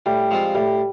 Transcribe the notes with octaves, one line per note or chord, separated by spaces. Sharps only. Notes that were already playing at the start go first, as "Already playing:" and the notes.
A2 G3
F3 G#3 C4 F4
A2 G3